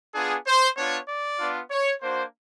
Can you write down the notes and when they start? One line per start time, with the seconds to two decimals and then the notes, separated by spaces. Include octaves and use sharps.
0.14 B3 D4 F4 G#4
0.47 C5
0.77 B3 D4 F4 C#5
1.08 D5
1.39 B3 D4 F4
1.70 C#5
2.01 A#3 D4 F#4 C5